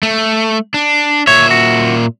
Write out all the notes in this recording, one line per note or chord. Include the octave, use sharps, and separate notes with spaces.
A3
D4
A#2 C#5 E5
F#4